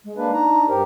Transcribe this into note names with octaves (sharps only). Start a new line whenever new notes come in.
G#3
A#3 D4 B4
D4 D#4 A#5
G2 G4 A#4 C5